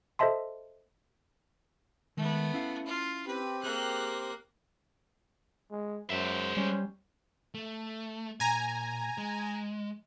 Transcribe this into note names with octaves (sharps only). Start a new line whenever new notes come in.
A4 C5 D#5 E5 A5 C6
D#3 G#3 A3 B3
C#4 E4 F5
F4
C4 G4 B4
A#3 G#4 F#6
G#3
F#2 G#3 C5 E5
G3 C#4
A3
A#2 G#5 A#5
G#3